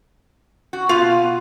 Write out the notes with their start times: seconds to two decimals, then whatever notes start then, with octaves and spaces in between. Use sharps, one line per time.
0.73 F#4
0.89 B2 F4 F5